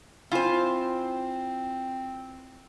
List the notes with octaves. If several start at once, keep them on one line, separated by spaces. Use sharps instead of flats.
C4 E4 F4 C5 G#5